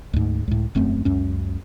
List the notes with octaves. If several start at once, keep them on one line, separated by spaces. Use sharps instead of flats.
D2 G#2
C#2 A2
E1 F#2 A3 C4
C#2 F#2 C#4